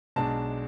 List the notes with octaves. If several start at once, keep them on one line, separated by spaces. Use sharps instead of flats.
B1 B2 G#3 D4 A5